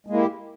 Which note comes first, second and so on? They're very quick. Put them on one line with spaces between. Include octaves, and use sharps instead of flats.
G#3 A#3 E4 G4